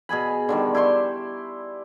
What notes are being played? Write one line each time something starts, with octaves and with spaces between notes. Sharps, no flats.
B2 G#4 G#5 B5
D3 D#3 G3
E4 G4 C6 C#6